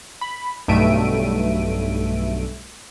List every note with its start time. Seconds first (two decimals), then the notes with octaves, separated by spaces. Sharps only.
0.21 B5
0.68 B1 G2 A3 E5 D7 D#7